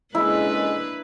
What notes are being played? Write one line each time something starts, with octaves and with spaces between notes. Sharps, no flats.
F2 C#3 G#3 A#3 D4 E4 B4